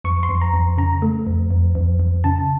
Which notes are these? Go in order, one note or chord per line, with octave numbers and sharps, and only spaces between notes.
F2 C#6
C6
F2
A#5
F2
C#3 A#5
A3
F2
F2
F2
F2
C#3 A5